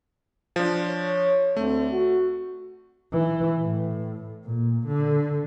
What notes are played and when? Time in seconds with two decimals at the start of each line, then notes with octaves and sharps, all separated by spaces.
0.56 F3 D4
0.88 C#5
1.57 D2 A3 C4
1.92 F#4
3.12 E3
3.60 A2
4.45 A#2
4.87 D3